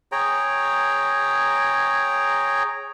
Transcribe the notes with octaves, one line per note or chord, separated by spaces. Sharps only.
G#4 C#5 G5 A#5